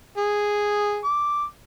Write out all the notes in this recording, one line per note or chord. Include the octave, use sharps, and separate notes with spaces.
G#4
D6